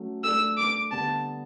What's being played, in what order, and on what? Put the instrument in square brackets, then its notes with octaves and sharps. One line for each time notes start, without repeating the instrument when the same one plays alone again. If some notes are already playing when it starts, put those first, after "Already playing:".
Already playing: [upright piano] F#3 A3 C#4
[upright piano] A3 D4 A4 [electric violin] E6
[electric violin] D6
[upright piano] D3 G3 B3 [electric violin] A5